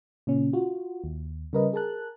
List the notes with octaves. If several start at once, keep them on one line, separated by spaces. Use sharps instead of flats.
A#2 C#3 C#4
F4 F#4
D#2
C#3 G3 A#4 B4 D#5
G#4 A#4 A5 F#6